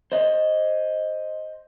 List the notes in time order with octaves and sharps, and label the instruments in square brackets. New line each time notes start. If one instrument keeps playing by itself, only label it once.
[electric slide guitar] C5 D#5